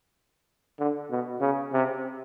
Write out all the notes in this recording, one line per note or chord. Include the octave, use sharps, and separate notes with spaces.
D3
B2
C#3
C3